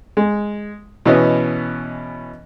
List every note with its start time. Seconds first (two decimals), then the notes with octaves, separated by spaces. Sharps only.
0.17 G#3
1.06 B2 E3 B3 C#4 D#5